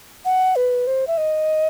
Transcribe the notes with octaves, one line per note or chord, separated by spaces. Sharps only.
F#5
B4
C5
E5
D#5